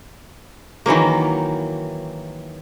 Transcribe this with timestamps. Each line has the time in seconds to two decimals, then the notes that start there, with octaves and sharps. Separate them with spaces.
0.86 D#3 E3 F#3 A#3